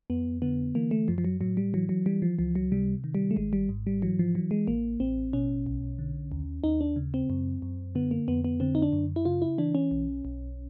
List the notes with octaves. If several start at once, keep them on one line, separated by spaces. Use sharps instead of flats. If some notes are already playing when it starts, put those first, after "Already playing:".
F2 B3
D3 B3
E3 A#3
A3
F#2 F3
F3
F#3
A2 F#3
G3
E3 F#3
F#3
E3 G3
F3
C#2 F3
F#3
C3 G3
D#3
G3
A3
G#1 G#3
G3
G#2
G3
E3 F#3
F3
E3 F#3
G#3
A1 A#3
A1 C4
B2 C#4
B1
D3
D#2
D#2 D#4
D4
C#3
C4
F#2
F#2
D3 B3
A#3
F2 B3
B3
D3 C4
D#4
D4
F#2
E4
C#3 F4
E4
E3 D4
C#4
B1
B1